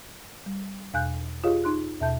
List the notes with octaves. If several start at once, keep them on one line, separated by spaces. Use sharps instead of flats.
G3
E2 B2 F5 G#5 F#6 G6
F4 G4 G#4 C#5 D#5 F5
D#4 C6 F#6
D#2 B2 E5 A5 G6